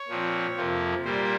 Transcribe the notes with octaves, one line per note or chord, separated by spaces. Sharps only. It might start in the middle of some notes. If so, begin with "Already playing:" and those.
Already playing: C#5
A#2 F3 C4
F2 C3 F3 A#3
A#2 G3 A#3 C5